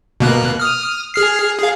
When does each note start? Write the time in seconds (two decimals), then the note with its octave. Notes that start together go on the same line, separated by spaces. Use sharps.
0.20 B2 A#3 F#6
0.60 D#6 F6
1.14 G#4 F6 C7
1.59 G#4 F5